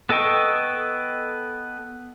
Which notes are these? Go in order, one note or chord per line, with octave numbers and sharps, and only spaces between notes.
B3 A4 D#5 G5 C#6